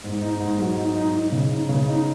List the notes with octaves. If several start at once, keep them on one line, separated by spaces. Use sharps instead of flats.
G#2
D#4
G#2
F#3
D#4
D#4
D#4
C#3
D#4
C#3
D#4